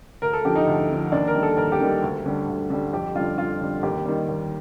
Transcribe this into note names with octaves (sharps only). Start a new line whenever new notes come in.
D2 A#4
A4
D3 F3 G4
D#4
D2
D3 F3
D#2 D4
A#4
D#3 G3
A4
D#2 A#4
G4
D#3 G3
D2
D3 G3
D2
D3 G3
F2 G4
D3 G3 F4
F2 F4
D3 G3
D#2 G4
D#3 G3
D#2